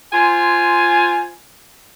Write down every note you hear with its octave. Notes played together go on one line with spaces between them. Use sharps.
F4 C5 G#5